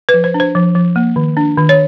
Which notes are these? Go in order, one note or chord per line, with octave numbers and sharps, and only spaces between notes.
B4
F3
C5
D4
C5
F3
F3
A#3
D#3
D4
D#3
C#5